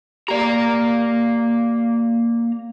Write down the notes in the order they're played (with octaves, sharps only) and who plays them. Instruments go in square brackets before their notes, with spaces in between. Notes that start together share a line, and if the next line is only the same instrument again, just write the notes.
[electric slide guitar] A#3 A#5 [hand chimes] G4 D5